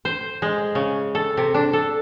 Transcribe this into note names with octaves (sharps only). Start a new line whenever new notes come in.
C5
G#3
C#3
A4
C3
D4
A4